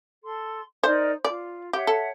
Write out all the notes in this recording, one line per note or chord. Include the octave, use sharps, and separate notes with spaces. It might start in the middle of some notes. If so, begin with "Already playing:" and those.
A4 C6
D#4 A#4 C5 D5
F4 D5
G4 C#5 E5 F#5
A4